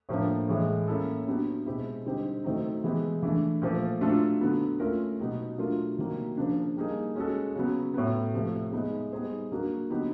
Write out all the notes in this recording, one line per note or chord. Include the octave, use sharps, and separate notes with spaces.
A2 F3 A#3 D4
A2 E3 G#3
A#3 C#4 E4 A4
F#3 B3 D4 G4
B2 G#3 C4 E4 G4
D3 G3 C4 D#4 G4
D#3 F#3 A3 C4 D#4
E3 G#3 B3 E4 G4
E3 A3 D4
A#2 F3 A3
F#3 A3 D4 F4 A4
D3 F#3 B3
A3 C#4 F4 A#4
B2 F#3 B3 D#4 G4
F#3 A3 D4 F4 A#4
C3 D#3 F#3 A#3
C#3 F3 A#3 D4
G3 A#3 D#4 G#4
G#3 C#4 F#4 A4
C#3 F#3 B3
A2 F#3 B3
C3 F3 A3
G#3 B3 D#4
G3 B3 D#4 G#4 C5
F#3 A#3 D4 F#4 A#4
D3 F#3 B3 D#4 G4